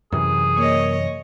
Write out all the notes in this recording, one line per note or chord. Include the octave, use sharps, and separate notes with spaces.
F#2 C3 E3 G#4
A#3 C#5 D#5